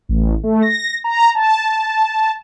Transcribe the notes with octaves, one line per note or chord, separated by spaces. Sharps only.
A1
A3
A#6
A#5
A5